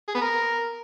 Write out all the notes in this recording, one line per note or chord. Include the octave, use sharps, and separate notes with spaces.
G#4
B3
A#4